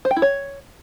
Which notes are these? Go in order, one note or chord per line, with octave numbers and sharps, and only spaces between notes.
C5
G5
E4
C#5